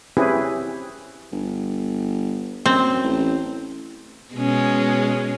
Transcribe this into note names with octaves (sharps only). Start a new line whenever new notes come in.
C4 C#4 E4 G4 G#4 B4
G1
F#2 C4
A1
B2 G#3 C#4